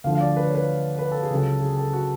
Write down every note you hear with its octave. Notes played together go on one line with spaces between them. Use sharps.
D2 D3 F3 F5
F5
D5
B4
C#5
B4
B4
A4
G#4
C#2 C#3 F#3 A4
G#4
A4
F#4